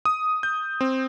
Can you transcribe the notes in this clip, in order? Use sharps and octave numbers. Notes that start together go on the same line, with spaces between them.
D#6
G6
C4